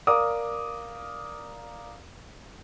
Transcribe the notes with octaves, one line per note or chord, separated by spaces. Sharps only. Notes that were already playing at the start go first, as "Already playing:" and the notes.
A#4 D5 F5 D6 D#6